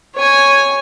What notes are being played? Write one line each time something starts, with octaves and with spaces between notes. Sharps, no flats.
C#5 G#5